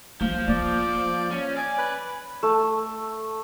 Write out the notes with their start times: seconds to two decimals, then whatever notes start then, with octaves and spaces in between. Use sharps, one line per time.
0.21 F3 A#3
0.48 A#3 D5
1.31 C#4
1.57 D5 G#5
1.78 B4
2.43 A3